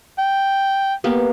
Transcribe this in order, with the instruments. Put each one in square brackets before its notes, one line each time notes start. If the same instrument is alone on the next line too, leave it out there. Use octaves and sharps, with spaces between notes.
[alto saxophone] G5
[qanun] A#3 B3 G4